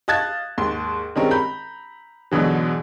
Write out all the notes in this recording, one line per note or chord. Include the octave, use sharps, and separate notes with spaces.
D#5 F5 A5 F#6 G#6 A6
D#2 G#2 C6
D#3 G3 G#3 C4 C#4 A#4
A#5 B5 G6
G#2 B2 D3 E3 F#3